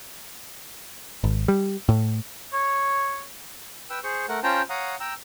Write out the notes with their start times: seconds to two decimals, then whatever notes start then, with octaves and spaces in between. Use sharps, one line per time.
1.24 G#1
1.48 G3
1.89 A2
2.53 C#5
3.90 B4 G5 E6
4.03 G#4 C5 C#6
4.29 A3 A#4 F#5
4.43 C#4 F4 C5 G5 A5 A#5
4.69 C#5 F5 F#5 A#5 D#6
5.00 G5 A#5 E6